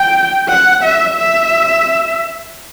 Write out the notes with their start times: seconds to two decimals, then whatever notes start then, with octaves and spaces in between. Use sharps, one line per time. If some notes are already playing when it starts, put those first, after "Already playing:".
Already playing: G5
0.49 F#5
0.83 E5
1.17 E5